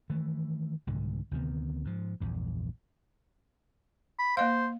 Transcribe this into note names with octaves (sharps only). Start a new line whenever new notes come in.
D#3 E3 A3
C2 G#2 D3 D#3
D2 C3 D#3 B3
G#2 F3
A#1 E2 G2
B5
A#3 C5 D#5 F5